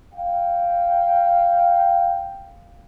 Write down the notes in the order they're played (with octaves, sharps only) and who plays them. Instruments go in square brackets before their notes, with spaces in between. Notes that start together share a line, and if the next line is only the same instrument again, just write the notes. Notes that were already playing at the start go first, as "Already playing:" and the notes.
[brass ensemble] F5 G5